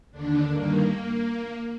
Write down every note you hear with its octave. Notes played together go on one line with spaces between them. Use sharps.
D#2 D3 D4
G2 D#3 A#3